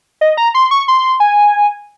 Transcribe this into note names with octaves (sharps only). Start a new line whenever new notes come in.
D#5
A#5
C6
C#6
C6
G#5